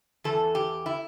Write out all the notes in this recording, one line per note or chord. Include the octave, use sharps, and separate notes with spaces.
E2 E3 A4
G4
E4